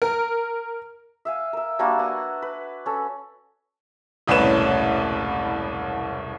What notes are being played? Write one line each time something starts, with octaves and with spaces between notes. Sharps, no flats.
A#4
E5 F5 G#5
A#4 E5
G3 A#3 D4 F#4
B4 F#5 G#5 A#5
B4
C#4 A4
E1 C2 A2 C#4 B4 E7